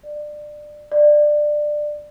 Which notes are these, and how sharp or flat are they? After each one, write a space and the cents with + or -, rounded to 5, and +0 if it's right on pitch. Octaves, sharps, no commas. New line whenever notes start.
D5 +25
D5 +20